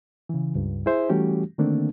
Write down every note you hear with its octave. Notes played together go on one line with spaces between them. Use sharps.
C#3 E3
C#2 G2
E4 G#4 C5 E5
E3 G3 A3 C#4 F#4 G4
D3 D#3 A3 A#3 C4 D4